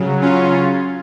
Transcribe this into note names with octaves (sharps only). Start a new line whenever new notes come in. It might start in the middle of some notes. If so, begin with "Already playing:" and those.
Already playing: C#3 F#3
C#4 F4